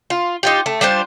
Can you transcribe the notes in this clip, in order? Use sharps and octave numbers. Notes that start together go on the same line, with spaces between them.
F4
D#4 F4 G4
A3
G3 D4 F4 C5